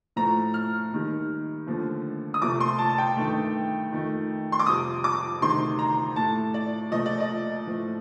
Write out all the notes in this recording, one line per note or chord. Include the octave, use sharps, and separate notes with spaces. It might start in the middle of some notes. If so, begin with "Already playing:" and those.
A2 F3 A3 A#5
F6
D#2 D#3 G3
D#2 D3 F3 A3
D#6
C2 C3 F3 A3 D6
C6
A5
A5
G5
G2 D#3 A3
F2 D#3 A3
C6
D6
F2 C3 G3 D#6
D6
D2 C3 D#3 G3 C6
A#5
A2 A3 A5
D5
C2 A#2 F3 A3 D#5
D5
D#5
A2 F3 A3